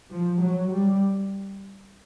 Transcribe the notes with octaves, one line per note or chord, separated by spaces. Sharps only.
F3
F#3
G3